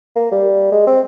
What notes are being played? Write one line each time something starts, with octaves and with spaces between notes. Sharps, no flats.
A#3
G3
G#3
C4